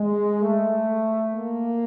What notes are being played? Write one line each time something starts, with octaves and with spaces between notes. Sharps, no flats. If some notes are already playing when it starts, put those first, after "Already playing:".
Already playing: G#3
A3
A#3